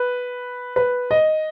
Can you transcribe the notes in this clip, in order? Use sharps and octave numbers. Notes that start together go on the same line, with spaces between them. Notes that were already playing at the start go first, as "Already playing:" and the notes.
Already playing: B4
B4
D#5